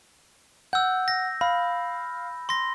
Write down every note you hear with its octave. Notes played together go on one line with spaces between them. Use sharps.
F#5 E6 G6
A#6
F5 B5
C6 A#6